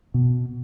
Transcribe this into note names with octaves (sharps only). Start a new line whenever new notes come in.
B2